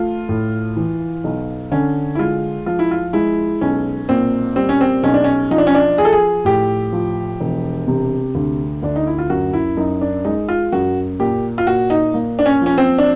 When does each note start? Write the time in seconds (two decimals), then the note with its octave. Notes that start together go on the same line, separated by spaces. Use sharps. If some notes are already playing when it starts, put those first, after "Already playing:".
Already playing: A3 F4
0.29 A2
0.77 E3
1.24 B1
1.72 D3 C#4
2.15 E4
2.19 G#3 F4
2.66 F3 F4
2.79 E4
2.91 F4
3.13 G#3 E4
3.61 B1 C#4
4.09 A#2 C4
4.56 G3 C4
4.69 C#4
4.81 C4
5.03 B1 C#4
5.14 D4
5.24 C#4
5.51 F3 D#4
5.58 D4
5.67 C#4
5.75 D4
5.98 F3 G#4
6.05 A4
6.12 G#4
6.45 A2 G4
6.93 F3
7.40 E1
7.88 C3
8.35 D2
8.83 D2 D4
8.96 D#4
9.07 E4
9.19 F4
9.30 F#2 F#4
9.53 E4
9.77 F#2 D#4
10.01 D4
10.25 G#3 D#4
10.49 F4
10.72 F#2 F#4
11.20 A#2 G4
11.58 F4
11.67 A#2 F#4
11.90 D#4
12.14 A#3
12.39 D4
12.46 C#4
12.62 F3 C#4
12.78 C4
12.99 D4